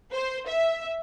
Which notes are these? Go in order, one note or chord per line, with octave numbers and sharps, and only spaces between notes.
C5
E5